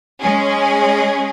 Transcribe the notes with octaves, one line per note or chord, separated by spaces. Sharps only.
G#3 C#4 G#4